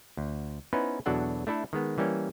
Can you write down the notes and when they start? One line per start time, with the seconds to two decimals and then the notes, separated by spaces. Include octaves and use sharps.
0.17 D2
0.73 B3 C#4 D#4 E4 B4 C5
1.06 E2 B2 F#3 D4 A4 F#5
1.47 A3 D4 E4 A4
1.73 D#3 G#3 B3
1.98 E3 G3 A#3 C#4